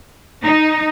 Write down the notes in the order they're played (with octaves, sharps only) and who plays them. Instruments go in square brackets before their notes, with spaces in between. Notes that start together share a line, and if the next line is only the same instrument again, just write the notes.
[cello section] D#4